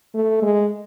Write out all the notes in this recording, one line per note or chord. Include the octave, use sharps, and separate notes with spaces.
A3
G#3